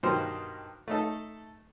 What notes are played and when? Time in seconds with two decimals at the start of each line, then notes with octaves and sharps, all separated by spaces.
0.03 G2 B2 D#3 C5
0.88 A3 D#4 A4